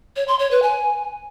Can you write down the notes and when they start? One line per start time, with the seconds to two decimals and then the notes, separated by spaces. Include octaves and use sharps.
0.16 C#5
0.28 C6
0.39 C#5
0.51 B4
0.63 G#5